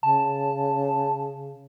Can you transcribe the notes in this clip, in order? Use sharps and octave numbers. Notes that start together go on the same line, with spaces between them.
C#3 A5